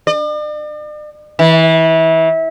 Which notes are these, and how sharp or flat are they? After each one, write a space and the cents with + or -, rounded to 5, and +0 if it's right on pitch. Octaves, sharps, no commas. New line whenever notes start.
D5 +45
E3 -25